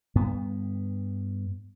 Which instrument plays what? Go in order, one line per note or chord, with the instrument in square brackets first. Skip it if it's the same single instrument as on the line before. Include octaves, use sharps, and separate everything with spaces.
[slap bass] G2 B3